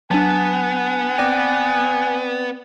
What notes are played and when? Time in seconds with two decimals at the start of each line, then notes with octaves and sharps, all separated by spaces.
0.11 F#3 B3 D4 F#5 G#5 A5
1.18 C4 D5 G5 D6 A#6 D#7